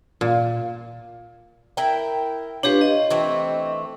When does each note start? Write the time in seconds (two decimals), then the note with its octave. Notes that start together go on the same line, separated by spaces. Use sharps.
0.21 A#2
1.77 E4 A#4 G5
2.63 D4 F4 G4 B4 C#5
2.81 D#5
3.10 E3 A3 C4